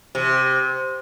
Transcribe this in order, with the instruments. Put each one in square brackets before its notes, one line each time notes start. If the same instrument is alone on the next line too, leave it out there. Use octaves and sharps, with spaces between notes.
[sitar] C3